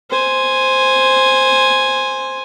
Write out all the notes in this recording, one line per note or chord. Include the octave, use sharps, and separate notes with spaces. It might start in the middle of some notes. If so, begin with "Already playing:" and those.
C5 G#5